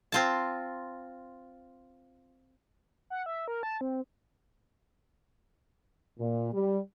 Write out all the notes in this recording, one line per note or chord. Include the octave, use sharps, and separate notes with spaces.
C4 F4 A5
F#5
E5
A#4
A5
C4
A#2
G3